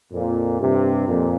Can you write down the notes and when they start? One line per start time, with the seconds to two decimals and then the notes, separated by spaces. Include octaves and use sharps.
0.12 F2 A#2
0.60 G2 C3
1.07 F2 A#2